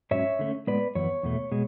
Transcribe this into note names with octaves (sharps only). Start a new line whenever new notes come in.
G#2 F#3 C#4 C#5 E5
D3 A3 C#4
A2 G#3 B3 B4 D5
F#2 E3 B3 C#5
E2 B2 A3
B2 G#3